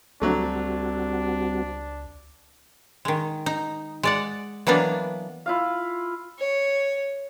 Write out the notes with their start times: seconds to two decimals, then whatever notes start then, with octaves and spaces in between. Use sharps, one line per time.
0.22 C#2 D3 F#3 G3 A3 C4 D4 F#4
3.05 D#3 G#3
3.46 D#4
4.03 G#3 D5 F#5
4.67 E3 F#3 A#3 B3 D4
5.46 E4 F4 F5
6.38 C#5